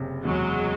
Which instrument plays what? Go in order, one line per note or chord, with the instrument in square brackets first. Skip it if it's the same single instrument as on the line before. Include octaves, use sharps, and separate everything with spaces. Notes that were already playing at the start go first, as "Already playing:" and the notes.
Already playing: [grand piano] F#1 C3
[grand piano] E2 [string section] F#3 G#3